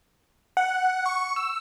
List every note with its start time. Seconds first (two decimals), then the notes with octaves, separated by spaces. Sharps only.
0.57 F#5
1.06 C#6
1.36 E6